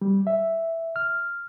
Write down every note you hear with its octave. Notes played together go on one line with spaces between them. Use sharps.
G3
E5
F6